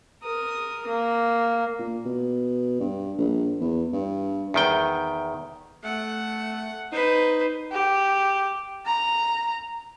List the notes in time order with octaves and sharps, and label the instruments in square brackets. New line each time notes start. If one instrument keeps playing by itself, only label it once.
[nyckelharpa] A#4 D#6
A#3
[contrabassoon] A#2
B2
G2
A#1
E2
G2
[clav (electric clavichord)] E2 D#3 G5
[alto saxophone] A3 [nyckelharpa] F#5
[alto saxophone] D#4 [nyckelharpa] B4 C5
[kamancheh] G4
A#5